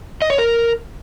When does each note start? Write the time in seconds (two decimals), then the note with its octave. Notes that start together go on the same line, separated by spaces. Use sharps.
0.22 D#5
0.30 C#5
0.38 A#4